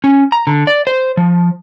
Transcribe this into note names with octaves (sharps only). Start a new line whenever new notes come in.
C#4
A#5
D3
D5
C5
F3